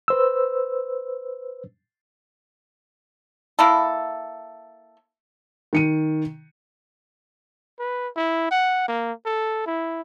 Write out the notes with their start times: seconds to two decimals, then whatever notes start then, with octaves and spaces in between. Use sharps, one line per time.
0.08 B4 C5 E6
3.59 A#3 E4 A4
5.73 D#3 C#7 D#7
7.79 B4
8.16 E4
8.51 F#5
8.88 A#3
9.25 A4
9.66 E4